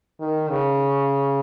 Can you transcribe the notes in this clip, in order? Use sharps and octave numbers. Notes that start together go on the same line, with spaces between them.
D#3
C#3